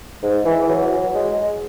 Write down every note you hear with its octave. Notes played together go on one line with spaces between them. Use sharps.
G#2
E3
E3
F#3
F#3
G#3